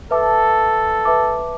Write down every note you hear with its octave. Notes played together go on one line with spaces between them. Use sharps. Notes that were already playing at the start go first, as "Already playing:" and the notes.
A4 B4 E5 A5 D6
B4 E5 A5 D6